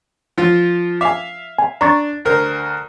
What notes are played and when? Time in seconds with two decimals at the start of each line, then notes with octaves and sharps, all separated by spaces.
0.38 F3 F4
1.01 E5 F5 G#5 D6
1.59 G#5
1.81 D4 A#5 C#6 A6
2.25 D2 A#4 C5